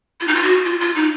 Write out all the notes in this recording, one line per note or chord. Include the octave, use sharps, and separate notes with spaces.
F4
D#4
F4
F#4
F4
F4
D#4